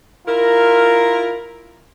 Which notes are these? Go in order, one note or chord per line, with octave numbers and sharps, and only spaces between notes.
E4 F4 A#4